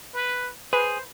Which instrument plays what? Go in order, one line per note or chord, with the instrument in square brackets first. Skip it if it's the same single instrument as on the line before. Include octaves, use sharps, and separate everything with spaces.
[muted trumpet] B4
[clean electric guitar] G#4 [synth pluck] B4 [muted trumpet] C5